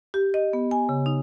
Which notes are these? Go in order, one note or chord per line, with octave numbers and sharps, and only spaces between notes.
G4
D#5
B3
G#5
C#3
D#4